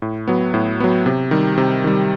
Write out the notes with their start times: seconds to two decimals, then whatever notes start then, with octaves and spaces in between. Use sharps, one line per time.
0.02 A2
0.27 F#3 B3
0.54 A2
0.80 F#3 B3
1.06 C3
1.31 D#3 G3
1.58 C3
1.84 D#3 G3